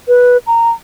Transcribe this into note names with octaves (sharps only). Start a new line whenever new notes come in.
B4
A#5